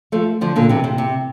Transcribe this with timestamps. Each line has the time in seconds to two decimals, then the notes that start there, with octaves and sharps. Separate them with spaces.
0.12 F3 A3
0.41 D3 F3
0.56 A#2 D3
0.69 C3 E3
0.84 C3
0.98 C3